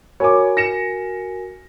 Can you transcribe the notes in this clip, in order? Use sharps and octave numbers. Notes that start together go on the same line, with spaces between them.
F#4 A#4 C#5 G#5 D6
A#6 C#7 E7